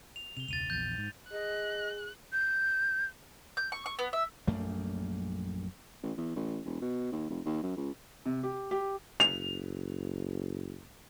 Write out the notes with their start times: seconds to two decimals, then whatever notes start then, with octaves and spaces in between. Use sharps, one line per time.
0.16 F7
0.37 C3 F7 G7
0.48 E1 C#2 A6 D#7 F7
0.70 A#1 E2 G6 A6
0.98 G#2
1.32 G#4 D#5 F#6
2.33 G6
3.57 G6
3.72 C#6
3.86 C#6
3.99 B3
4.13 E5
4.47 A#1 F#2 A3 A#3
6.03 A1
6.18 E2
6.36 A1
6.65 E1
6.82 B2
7.12 D#2
7.30 F1
7.46 D#2
7.63 F#2
7.76 C#2
8.26 C3
8.43 G4
8.71 G4
9.20 F#1 F7